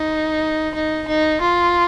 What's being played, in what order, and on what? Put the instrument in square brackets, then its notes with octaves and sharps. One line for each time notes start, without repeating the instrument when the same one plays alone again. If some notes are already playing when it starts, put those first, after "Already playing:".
Already playing: [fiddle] D#4
D#4
D#4
F4